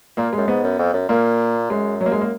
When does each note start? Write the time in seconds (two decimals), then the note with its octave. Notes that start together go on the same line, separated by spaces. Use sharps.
0.17 A#2 A#3
0.33 F#2 G#3
0.48 G#2 B3
0.64 F#2
0.79 F2
0.94 F#2
1.09 A#2 A#3
1.70 F#2 G#3
2.01 F#3
2.06 A#3
2.12 G#3
2.21 A#3